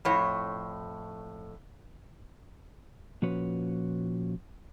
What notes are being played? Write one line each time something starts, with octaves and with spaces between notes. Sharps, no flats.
F2 A2 C#5
A#2 F3 C#4 F#4 B4 C#5